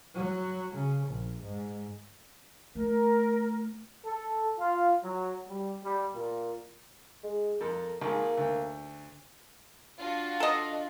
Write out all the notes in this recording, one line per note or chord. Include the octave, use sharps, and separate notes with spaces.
F#3
C#3
A#1
G#2
A3 A#4
A4
F4
F#3
G3
G3
A#2
G#3
F2 A4 A#4
G#1 A#3 G#4
D2
D4 F4 F#4
A4 D#5